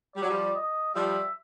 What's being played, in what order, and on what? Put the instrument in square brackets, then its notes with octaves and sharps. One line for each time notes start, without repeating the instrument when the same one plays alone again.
[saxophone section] G3 [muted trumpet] D5
[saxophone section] F#3
F3 G3
[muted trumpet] D#5
[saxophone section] F3 G3 [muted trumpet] E5